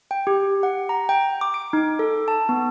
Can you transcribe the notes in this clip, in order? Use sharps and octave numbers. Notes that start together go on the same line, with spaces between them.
G5
G4
F#5
A#5
G5
D6
D7
D#4
A4
A5
B3